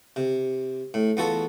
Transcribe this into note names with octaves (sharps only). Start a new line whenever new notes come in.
C3
A2
E2 B3 F4 F#4 A4